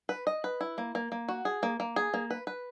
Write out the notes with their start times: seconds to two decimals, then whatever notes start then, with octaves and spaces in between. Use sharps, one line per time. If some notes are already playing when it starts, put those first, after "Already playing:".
0.09 B4
0.27 D#5
0.44 B4
0.61 E4
0.78 A#3
0.95 A#3
1.12 A#3
1.28 F#4
1.45 G#4
1.63 A#3
1.80 A#3
1.96 G#4
2.14 A#3
2.30 B4
2.47 B4